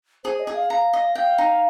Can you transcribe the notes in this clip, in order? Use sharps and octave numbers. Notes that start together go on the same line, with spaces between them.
G#4 C5
D#5
G#4
F5
F5 A#5
D#5
F5 G5
D#4